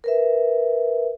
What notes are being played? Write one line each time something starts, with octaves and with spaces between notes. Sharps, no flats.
A#4 B4 E5